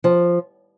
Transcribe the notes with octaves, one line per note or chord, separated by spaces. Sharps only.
F3